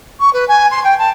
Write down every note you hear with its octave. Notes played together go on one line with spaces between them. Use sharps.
C#6
B4
G#5
C6
G5
A5